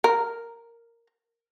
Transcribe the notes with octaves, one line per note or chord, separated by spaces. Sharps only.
A#4